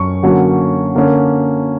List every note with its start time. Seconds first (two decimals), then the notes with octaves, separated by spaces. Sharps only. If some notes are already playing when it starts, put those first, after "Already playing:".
Already playing: F#2 C#4 C#6
0.23 D3 F#3 A#3 C#4
0.95 D3 A#3 C#4